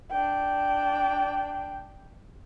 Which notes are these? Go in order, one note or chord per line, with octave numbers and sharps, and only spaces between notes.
D4 G5